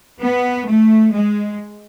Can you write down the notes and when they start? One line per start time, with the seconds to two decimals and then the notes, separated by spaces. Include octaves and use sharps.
0.21 B3
0.67 A3
1.13 G#3